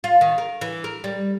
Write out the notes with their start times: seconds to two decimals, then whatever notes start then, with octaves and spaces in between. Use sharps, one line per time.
0.04 F4
0.21 D#3
0.38 A#4
0.61 E3
0.84 A#4
1.04 G3